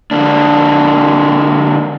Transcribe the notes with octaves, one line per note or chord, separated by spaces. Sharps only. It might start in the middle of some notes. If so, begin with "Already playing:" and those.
D3 A#3 D4